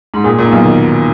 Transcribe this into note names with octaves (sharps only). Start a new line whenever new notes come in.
G#2
A#2 G#4
A#2
D#4
B1 B2
D#3